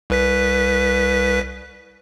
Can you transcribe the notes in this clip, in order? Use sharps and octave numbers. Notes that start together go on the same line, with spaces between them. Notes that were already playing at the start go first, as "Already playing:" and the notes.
C2 B4 B6